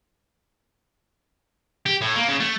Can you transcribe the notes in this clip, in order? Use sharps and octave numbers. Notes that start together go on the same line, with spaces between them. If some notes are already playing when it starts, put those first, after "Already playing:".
G4
A2
A#3
C#3
A3